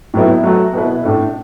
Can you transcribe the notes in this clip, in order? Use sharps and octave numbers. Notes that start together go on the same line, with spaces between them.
A2 F#3 B3 E4
F#3 A3 F#4
B2 B3 E4 B4
A2 A3 D4 A4